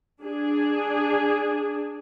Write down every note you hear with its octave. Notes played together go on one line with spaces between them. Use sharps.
D4 G#4